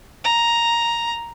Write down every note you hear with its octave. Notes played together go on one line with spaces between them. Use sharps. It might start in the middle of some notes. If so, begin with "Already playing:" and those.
A#5